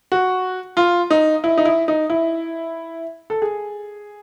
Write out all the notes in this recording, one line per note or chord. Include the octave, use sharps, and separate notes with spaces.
F#4
F4
D#4
E4
D#4
E4
D#4
E4
A4
G#4